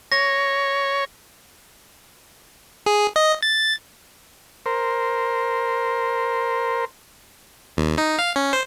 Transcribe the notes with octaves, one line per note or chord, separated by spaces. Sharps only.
C#5 A#6
G#4
D#5
A6
A#4 C5
D#2
D#4
F5
C#4
C5